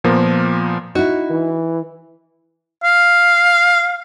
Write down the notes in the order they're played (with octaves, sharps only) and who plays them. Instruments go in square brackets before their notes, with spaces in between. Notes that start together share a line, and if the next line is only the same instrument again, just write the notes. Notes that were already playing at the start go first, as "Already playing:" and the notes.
[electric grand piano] A#2 F3 A#3 B3 A#4
[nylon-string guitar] D#4 E4 [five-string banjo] F#4
[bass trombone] E3
[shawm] F5